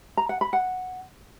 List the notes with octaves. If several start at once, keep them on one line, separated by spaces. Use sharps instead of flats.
A#5
F#5
B5
F#5